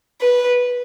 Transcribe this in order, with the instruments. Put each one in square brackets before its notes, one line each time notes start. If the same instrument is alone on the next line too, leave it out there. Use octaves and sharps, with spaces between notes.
[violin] B4